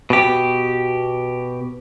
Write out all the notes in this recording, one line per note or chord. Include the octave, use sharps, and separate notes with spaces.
B2 G4